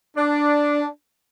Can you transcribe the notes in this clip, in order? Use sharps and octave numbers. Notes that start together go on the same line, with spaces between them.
D4